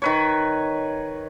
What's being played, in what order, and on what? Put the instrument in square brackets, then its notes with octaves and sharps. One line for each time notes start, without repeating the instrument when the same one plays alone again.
[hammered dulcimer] D#3 B4 C#5